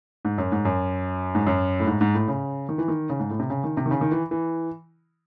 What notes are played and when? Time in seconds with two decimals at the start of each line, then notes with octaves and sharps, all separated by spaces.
0.25 G#2
0.38 F#2
0.52 G#2
0.65 F#2
1.35 G#2
1.47 F#2
1.80 A2
1.87 G#2
2.01 G#2
2.15 A2
2.28 C#3
2.69 D#3
2.78 E3
2.88 D#3
3.10 C#3
3.19 G#2
3.30 A2
3.40 C3
3.50 C#3
3.64 D#3
3.77 C3
3.86 D#3
3.91 C#3
4.01 D#3
4.11 E3
4.31 E3